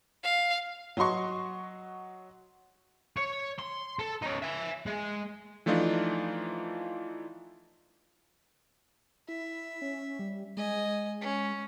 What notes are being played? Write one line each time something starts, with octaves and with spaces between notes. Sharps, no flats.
F5
F#3 F#4 D#5 C6 C#6
C#5
C6
A4
C#4 D#4
E5 G#5
G#3
E3 F3 A3 D4 D#4 F4
E4 E5
C#4
G3
G#3 D#5 G#5
C#4